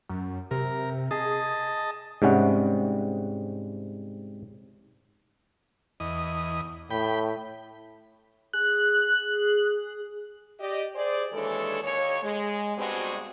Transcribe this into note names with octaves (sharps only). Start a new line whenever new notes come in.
F#2
C3 A#4
G#4 D#5 A5
G#2 C3 G3 C#4 F#5
E2 D#5
A2 G5 B5
G#4 F#6
G4 D5 D#5
G#4 C5 D5
D#2 E3 G#3 D4 A4 C#5
D#2 C#5
G#3
G2 B2 G3 G#3 C4 F#4